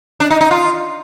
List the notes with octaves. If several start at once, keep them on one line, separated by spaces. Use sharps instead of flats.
D4
D#4
D#4
F4